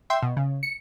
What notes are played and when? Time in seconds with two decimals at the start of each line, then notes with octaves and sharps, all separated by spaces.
0.10 E5 G5 C6
0.23 B2
0.37 C#3
0.63 C#7